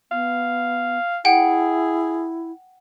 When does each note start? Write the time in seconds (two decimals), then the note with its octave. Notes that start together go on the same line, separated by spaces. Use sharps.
0.11 B3 F5
1.25 E4 G#4 F#5 G5